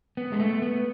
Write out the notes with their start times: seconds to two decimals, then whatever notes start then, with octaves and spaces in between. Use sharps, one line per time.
0.17 B3
0.32 G#3
0.40 A3
0.62 B3